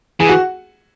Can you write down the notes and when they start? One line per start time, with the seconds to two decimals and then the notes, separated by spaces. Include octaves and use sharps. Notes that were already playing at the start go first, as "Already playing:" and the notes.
0.20 E3 G#4 G#5
0.29 F#4 F#5